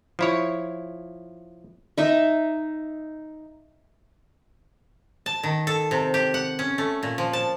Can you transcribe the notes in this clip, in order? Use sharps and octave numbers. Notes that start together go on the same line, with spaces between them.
F3 E4 C#5
D#4 E5
A5
D#3
A4
C3
G4
F#5
C#4
A3
A#2
F3
A5